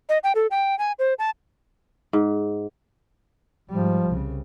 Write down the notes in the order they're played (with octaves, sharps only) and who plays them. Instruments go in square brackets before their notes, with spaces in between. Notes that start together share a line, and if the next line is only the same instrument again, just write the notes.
[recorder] D#5
G5
A4
G5
G#5
C5
A5
[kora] G#2
[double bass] G#2 G3 [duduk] F3
[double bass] C2 C#3